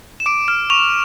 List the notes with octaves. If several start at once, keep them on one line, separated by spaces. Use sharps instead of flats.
E7
D6 D7
F6 E7
C#6 F7